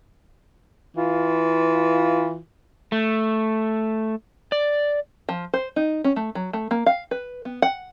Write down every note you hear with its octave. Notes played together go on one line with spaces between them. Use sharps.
E3 F4
A3
D5
F3
C5
D#4
C#4
A3
F#3
A3
A#3
F5
B4
B3
F#5